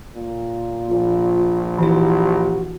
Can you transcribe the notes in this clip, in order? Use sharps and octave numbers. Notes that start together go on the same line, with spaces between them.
A#2
A#1 F4
E3 E4 F#4 G4